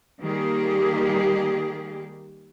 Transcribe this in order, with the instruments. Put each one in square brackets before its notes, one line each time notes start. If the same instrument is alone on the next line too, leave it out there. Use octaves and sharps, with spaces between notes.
[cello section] D#3 G3 A#3 G4 G#4